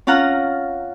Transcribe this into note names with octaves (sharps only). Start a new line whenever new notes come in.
C#4 F4 F5 F#5 A#5